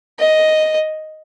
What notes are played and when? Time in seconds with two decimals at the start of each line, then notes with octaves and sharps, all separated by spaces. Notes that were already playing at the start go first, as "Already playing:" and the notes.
0.20 D#5